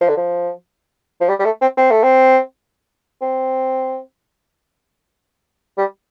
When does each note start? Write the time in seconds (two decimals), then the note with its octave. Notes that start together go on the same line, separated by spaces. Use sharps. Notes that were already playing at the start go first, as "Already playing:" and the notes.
0.01 F3
0.09 D3
0.17 F3
1.21 F3
1.29 G3
1.39 G3
1.45 A3
1.61 C4
1.77 C4
1.91 A3
2.03 C4
3.21 C4
5.78 G3